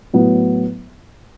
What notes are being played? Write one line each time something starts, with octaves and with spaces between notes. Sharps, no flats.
A2 F#3 B3